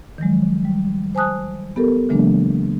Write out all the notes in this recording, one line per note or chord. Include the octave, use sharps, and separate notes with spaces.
D#3 F3 F#3 G#3
G3
C5 G#5 A5 D#6 F#6
B3 G4 A4 A#4
C#3 E3 F#3 G#3 A#3 D4